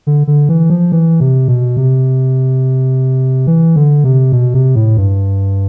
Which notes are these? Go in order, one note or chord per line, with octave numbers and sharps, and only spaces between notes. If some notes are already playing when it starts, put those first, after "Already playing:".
D3
D3
E3
F3
E3
C3
B2
C3
E3
D3
C3
B2
C3
A2
G2